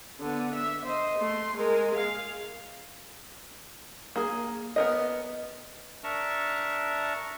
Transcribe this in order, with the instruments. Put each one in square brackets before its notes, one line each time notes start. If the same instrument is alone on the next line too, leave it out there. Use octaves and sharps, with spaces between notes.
[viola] D3 B3
E5
C5 D#5
A3 C6
G#3 A#4
G#4 F5
[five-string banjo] A#3 G#4
B3 A#4 D#5
[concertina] D4 A#4 E5 A5 A#5 C#6